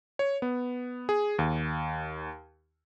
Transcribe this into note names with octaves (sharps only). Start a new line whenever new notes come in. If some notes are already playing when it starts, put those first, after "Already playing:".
C#5
B3
G#4
D#2